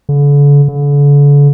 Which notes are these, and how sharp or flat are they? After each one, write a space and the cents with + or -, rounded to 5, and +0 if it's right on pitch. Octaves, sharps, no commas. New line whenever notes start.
D3 -40
D3 -40